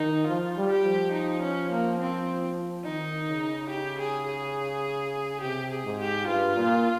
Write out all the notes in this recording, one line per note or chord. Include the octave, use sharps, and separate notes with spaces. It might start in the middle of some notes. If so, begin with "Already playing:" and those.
Already playing: D#3 D#4
F3 F4
G3
G4
F3
D#4
C#4
A#3
C4
D#3 D#4
C#3
G4
G#4
G#4
C3 G4
G#4
G#2
G4
G2 F4
A#2